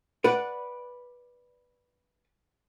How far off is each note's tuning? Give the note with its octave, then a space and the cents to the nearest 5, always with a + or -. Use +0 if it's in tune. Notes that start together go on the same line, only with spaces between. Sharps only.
B4 -10 D5 +0 F#5 +0